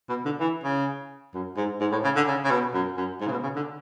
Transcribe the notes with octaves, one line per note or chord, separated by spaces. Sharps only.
B2
D3
E3
C#3
F#2
G#2
G#2
A2
C#3
D3
C#3
C#3
B2
F#2
F#2
G#2
C#3
B2
C#3
D3